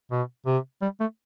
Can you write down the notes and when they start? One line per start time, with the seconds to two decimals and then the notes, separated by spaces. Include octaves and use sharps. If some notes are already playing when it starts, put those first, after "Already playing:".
0.11 B2
0.47 C3
0.82 G3
1.00 A3